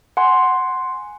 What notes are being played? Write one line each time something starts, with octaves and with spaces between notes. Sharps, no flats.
F#5 G#5 C6